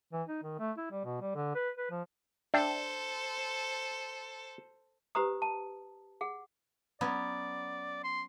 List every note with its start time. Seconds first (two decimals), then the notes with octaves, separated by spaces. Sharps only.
0.13 E3
0.28 D#4
0.43 D#3
0.59 A3
0.78 E4
0.91 G3
1.05 B2
1.21 G3
1.35 D3
1.55 B4
1.77 B4
1.91 F3
2.54 D4 A4 C5 E5 G5
5.15 G4 B4 C5 A#5 D#6
5.42 A5
6.21 G#4 F#5
7.01 F#3 B3 C#4 D5
8.04 C6